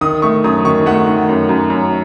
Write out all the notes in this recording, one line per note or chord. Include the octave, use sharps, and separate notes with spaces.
D#3 D#6
A3 C#6
F#2 D#6
D#3 C#6
A3 F#5
D#3
F#2
F#2
F#2